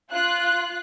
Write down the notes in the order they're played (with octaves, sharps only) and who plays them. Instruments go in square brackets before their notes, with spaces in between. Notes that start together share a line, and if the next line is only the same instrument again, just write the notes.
[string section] F4 F#6